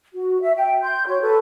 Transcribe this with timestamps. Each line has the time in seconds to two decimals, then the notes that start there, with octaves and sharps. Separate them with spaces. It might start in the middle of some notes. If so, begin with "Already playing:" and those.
0.13 F#4
0.41 E5
0.57 G5
0.82 C6 G6
1.07 F#4 C#5
1.21 A4 B4